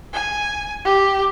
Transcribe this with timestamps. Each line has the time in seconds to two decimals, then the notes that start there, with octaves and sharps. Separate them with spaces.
0.13 G#5
0.85 G4